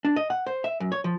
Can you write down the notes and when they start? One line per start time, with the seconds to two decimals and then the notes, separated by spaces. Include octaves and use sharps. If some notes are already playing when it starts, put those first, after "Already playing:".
0.05 D4
0.16 D#5
0.30 F#5
0.47 C5
0.64 E5
0.80 F#2
0.92 C#5
1.04 F3